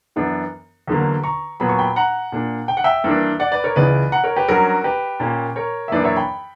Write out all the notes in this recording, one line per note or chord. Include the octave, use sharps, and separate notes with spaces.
F#2 E3 B3 D4
E2 D3 F#3 A#3
A#5 C#6
A#2 F#3 B3 B5
C#6
G5 B5
F#5 A#5
A#2 A#3 D4
G5
F#5
E5 G5
G2 E3 A#3 D4
D5 F#5
B4 D5
A#4 C#5
C#2 C#3 E3 B4 D5
F#5 A#5
A#4 C#5
G4 B4
G2 F#3 C#4 F#4 A#4
G4 B4
A#2 A#3 C#4
A#4 C#5
E5
F#2 E3 A#3 D4 B4 D5
C#5 E5
G5 B5